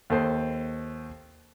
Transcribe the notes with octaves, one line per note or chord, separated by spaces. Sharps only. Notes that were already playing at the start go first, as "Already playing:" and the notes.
D#2 A4 C5